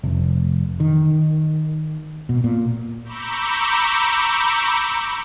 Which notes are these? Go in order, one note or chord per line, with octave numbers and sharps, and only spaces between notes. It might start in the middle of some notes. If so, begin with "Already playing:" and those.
F1
D#3
B2
A#2
A#5 B5 C#6 D6 E6 G6